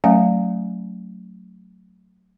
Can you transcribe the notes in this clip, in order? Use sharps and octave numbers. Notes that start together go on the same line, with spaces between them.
F#3 A3 C#4 E5 G#5